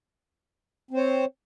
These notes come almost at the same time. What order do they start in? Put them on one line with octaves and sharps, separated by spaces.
C4 C5 C#5